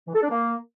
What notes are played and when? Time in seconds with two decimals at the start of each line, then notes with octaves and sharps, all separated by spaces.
0.08 E3
0.15 A4
0.22 D4
0.30 A#3